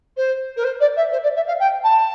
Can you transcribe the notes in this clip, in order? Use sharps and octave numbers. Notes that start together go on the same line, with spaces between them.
C5
A#4
C5
D5
E5
C5
D5
E5
F5
G5
A5